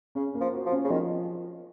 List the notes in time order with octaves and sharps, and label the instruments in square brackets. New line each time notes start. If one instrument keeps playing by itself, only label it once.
[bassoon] C#3 [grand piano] C#4
[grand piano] A#3
[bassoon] F3
[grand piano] F#4
[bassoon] F3
[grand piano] C#4
[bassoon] C#3
[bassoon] D#3 [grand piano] F3